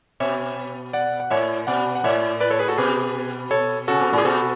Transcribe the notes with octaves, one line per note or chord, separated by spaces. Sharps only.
B2 C#5 E5
D5 F#5
F#5
A2 C#5 E5
B2 D5 F#5
F#5
A2 C#5 E5
B4 D5
A4 C#5
G#4 B4
F#4 A4
B2 G#4 B4
A4 C#5
C#3 F#4 A4
B2
A2
G#4
B2 F#4 A4